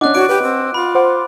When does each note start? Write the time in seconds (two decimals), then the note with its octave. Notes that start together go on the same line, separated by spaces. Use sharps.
0.01 C#4 D4 D#5 F#5 D6 F#6
0.15 D4 F#4 C#5 D7
0.29 G4 B4
0.43 C4
0.74 F4 B5
0.95 C5 F#5 D6